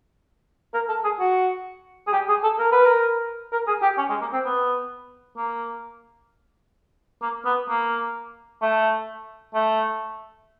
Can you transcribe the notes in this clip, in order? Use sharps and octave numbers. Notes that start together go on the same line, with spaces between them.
A#4
A4
G#4
F#4
G#4
G4
G#4
A4
A#4
B4
A#4
A#4
G#4
G4
C#4
G#3
A#3
C4
B3
A#3
A#3
B3
A#3
A3
A3